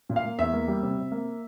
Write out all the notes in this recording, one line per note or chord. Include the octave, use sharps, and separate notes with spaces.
A#2
F5
A#3
E2 E5
A#3
G3
C3
C3
A#3